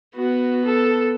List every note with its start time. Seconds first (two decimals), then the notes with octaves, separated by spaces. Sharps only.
0.16 B3 F#4
0.66 A4